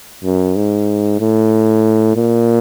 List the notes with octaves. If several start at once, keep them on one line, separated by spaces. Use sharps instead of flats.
F#2
G#2
A2
A#2